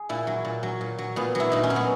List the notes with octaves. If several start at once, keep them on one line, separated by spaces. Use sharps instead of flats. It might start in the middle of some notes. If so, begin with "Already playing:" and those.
Already playing: G#4
A#2 E4
F#3
A#2
F#3
A#2
F#3
A#2 B3
F#3 E4
A#2 D#4
C#4
F#3
B3